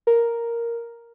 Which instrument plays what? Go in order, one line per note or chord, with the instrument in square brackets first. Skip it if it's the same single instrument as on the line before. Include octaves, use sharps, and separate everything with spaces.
[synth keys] A#4